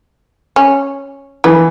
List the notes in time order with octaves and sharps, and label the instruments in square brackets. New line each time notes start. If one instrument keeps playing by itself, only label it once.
[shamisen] C#4
[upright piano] E3 [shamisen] B3